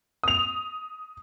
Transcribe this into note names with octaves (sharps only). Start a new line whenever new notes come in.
D#6 F7